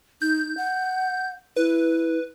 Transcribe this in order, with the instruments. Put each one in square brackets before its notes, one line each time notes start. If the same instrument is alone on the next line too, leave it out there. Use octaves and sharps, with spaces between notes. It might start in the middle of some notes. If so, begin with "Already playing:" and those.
[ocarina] D#4 [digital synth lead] G6
[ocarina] F#5
[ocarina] E4 [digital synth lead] B4